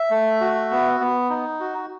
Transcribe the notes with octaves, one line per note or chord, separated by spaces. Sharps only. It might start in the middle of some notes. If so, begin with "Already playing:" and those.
Already playing: E5
A3
F#4
B3
B3
D#4
F#4